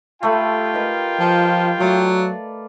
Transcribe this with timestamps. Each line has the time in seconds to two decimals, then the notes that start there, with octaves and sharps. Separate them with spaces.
0.23 A3 F4 G4 A4 G5 B5
0.74 A#4 B4 D#5
1.19 F3
1.79 F#3 A3 D5 F5